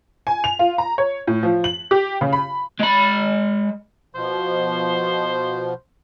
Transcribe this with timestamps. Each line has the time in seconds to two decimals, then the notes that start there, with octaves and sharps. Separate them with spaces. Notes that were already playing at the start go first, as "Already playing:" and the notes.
0.27 G#5
0.44 F7
0.59 F4
0.78 A#5
0.98 C#5
1.27 A2
1.43 F3
1.64 F#7
1.91 G4
2.21 C#3
2.33 B5
2.79 G#3 B5
4.15 B2 F3 C5